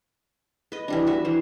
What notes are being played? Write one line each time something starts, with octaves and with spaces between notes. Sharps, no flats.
B4 D#5
E3 G3 D4
F#4 B4 E5
E3 C5